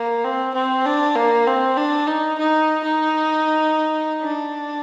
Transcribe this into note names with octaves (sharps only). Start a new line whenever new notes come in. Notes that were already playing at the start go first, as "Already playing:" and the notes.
Already playing: A#3
C4
C4
D4
A#3
C4
D4
D#4
D#4
D#4
D4